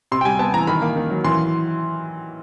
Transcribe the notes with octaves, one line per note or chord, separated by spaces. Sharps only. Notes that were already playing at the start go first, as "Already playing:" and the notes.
C3 C6
G5
G3 G#5
B3 A5
E3 A#5
D#3 B5
A#3
D#3
F#3
E3 C6